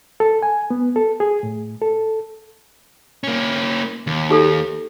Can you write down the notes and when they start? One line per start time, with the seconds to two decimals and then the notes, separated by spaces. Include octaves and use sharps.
0.20 A4
0.43 G#5
0.70 B3
0.96 A4
1.20 G#4
1.43 A2
1.82 A4
3.24 A#3 C#4
4.07 D#2
4.30 D#4 G4 A4